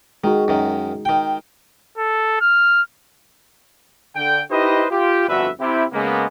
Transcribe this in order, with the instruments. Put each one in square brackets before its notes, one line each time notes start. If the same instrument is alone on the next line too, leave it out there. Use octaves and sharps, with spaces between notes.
[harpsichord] D#3 [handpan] G#3 D#4 F#4
[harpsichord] F#2 D#3
D#3 G5
[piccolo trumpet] A4
F6
[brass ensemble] D3 G5
D#4 E4 G4 B4 C5 D#5
F4 G4
G1 F2 D4 F#4 B4 E5
C3 E4 G4
C#3 G#3 A#3 B3